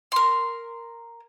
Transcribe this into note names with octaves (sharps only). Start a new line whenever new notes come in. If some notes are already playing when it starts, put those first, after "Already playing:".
A#4 C6